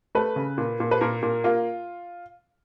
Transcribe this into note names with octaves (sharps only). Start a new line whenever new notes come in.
A3 B4
C#3
A#2
A#2
B4
A#2 A#4
A#2
A#3 F4